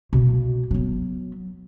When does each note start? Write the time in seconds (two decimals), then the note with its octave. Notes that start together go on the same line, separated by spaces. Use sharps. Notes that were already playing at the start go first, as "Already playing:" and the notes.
0.13 B2 A#3
0.71 F#3 B3